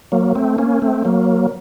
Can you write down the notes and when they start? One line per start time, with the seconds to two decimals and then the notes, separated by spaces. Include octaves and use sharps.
0.12 F#3 A#3
0.35 A3 C4
0.58 A#3 C#4
0.82 A3 C4
1.05 F#3 A#3